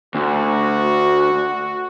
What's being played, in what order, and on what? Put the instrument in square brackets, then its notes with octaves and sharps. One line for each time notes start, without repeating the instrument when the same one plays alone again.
[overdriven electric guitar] D2 [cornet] F#4